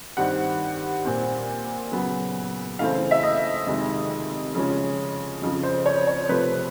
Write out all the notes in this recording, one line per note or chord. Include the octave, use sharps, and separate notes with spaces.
G2 D#3 G3 C4 F#5
A#2 G3 C4
C#3 F#3 B3
C#3 E3 A3 C4 F5
E5
D#5
F2 C3 D#3 G#3
C#3 F3 G#3 C#4
F2 C#3 F3
C5
C#5
C#5
C3 F3 A3 C4 B4